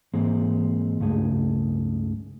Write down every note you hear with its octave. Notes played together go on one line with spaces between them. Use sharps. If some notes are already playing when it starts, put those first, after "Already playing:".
G#2 E3 G#3 A#3 C4
C#2 G2 C#3 A3 G#4